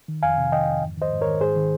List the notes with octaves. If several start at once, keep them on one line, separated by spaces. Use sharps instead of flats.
D#3
F2 F5 G#5
C3
D#3 D#5 G5
F2
G#2
D#3 C5 D#5
G#2
A#4 C#5
D#3
G#2 G#4 C5
D#3